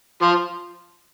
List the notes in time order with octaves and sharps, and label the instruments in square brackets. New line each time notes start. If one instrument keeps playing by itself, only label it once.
[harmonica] F3